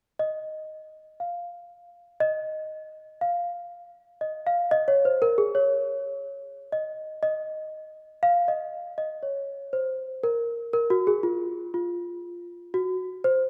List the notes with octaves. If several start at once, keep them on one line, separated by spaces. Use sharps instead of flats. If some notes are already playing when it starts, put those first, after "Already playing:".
D#5
F5
D#5
F5
D#5
F5
D#5
C#5
C5
A#4
G#4
C#5
D#5
D#5
F5
D#5
D#5
C#5
C5
A#4
A#4
F#4
G#4
F4
F4
F#4
C5